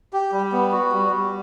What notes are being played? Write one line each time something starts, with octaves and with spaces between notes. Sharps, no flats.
G4
G3
B3
F#4
G3
G3